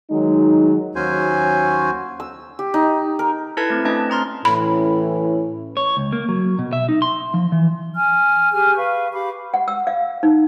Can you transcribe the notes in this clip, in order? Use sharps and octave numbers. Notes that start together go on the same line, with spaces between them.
D#3 F#3 G#3 D#4
D#2 F#3 C#4 F#4 C5 G#5
E6
G4
D#4
A#4
E4 A4 B4 A5 G#6
A3 C4
A3 C#4 D4 B4 D#5 A5
C4 A#5 C6 F6
A2 E3 C#4 B5
C#5
C#2
A#3
F#3
B2
E5
D#4
C6
F3
E3
G#5 F6
G4 G#4 G#5 F6
B4 F5 C#6
G4 F5 B5 D6
F#5
E6
F5
D#4